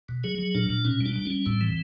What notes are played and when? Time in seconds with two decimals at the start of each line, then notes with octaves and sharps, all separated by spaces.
0.09 B2
0.24 F#3 G#4
0.39 F#3
0.55 A#2 D4
0.70 A#2
0.85 B2 C#4
1.01 G3 D4
1.16 G3
1.25 C#4
1.31 G3
1.46 A2 C4
1.61 E3